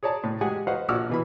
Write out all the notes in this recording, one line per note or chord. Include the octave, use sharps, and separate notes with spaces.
G#4 C#5 D5 A5 A#5
A2
G#3 G4 G#4 F#5 G#5
F#4 B4 C5 D#5 F5 F#5
A#1 F#4 D5 D6 E6 F6
B2 E3 B5